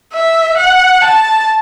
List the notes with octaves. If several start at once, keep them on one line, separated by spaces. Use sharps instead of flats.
E5
F#5
A5